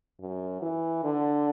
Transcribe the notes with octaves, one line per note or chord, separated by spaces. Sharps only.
F#2
E3
D3